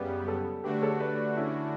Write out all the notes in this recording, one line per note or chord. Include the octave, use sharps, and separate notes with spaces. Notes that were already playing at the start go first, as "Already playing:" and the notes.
Already playing: F#2 C#3 G3 B3 G4 B4
A4 C#5
D3 A3 D4 F#4 G4 B4
A4 C#5
B4 D5
C#4 E4